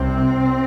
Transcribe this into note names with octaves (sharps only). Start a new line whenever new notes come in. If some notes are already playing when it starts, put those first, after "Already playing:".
Already playing: C2 C3 C4